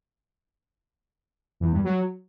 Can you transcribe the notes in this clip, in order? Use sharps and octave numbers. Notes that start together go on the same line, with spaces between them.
E2
G2
F#3